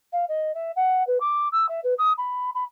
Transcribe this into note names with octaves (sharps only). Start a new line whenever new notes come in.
F5
D#5
E5
F#5
B4
D6
E6
E5
B4
D#6
B5
B5